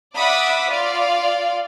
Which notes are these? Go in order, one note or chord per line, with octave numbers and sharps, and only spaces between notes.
D5 E5 F#5 B5 D6 D#6
F4 D5 F5